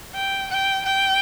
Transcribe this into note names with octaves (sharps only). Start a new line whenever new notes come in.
G5
G5
G5